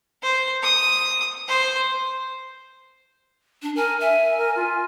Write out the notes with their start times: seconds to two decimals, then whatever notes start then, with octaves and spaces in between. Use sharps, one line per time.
0.22 C5
0.63 D#6
1.48 C5
3.62 D4
3.76 A#4 G#5
4.01 E5 G#5
4.38 A#4
4.56 F4